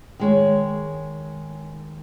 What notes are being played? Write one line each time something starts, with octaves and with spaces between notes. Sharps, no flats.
D#3 G#3 C#5